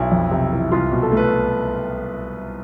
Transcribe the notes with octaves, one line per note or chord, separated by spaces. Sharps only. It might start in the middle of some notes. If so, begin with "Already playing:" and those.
Already playing: B1 E4
F2
C3
E3
C2 F4
B2
A4
A3
B4